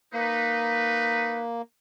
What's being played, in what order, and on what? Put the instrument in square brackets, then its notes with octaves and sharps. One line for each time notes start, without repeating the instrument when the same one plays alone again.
[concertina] A#3 [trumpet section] D#4 B4